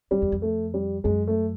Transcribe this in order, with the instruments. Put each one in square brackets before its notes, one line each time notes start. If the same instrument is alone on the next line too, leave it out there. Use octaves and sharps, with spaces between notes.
[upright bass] F2 [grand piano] G3
[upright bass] E2
F2
[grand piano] A3
G3
[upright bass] F#2 [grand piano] G#3
[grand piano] A3